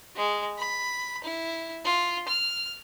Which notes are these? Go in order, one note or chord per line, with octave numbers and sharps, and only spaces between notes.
G#3
B5
E4
F4
F6